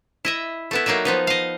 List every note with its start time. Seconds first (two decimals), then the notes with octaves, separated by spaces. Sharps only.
0.25 E4 D#5 E5
0.71 A3 B3 E4
0.86 F#3 A#3 D#4 D5 E5
1.05 F3 B3 D#4
1.27 D#5 F5